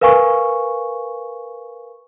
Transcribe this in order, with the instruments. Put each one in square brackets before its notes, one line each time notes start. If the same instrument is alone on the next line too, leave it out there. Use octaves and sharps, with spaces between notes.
[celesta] A#4 B4 F5 G#5 C#6